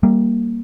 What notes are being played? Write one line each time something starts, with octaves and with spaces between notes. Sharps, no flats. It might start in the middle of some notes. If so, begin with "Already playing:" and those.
G3 A#3